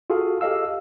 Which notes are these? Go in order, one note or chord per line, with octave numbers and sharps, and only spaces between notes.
F4 F#4 G#4 A4 F5
G4 A4 D#5 F5 E6